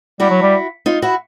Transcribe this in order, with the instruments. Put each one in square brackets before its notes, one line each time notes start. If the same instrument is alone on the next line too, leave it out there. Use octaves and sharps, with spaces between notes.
[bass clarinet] G3 [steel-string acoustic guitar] E4 F#4
[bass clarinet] F#3
G3
[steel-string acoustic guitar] D#4 F4
E4 F#4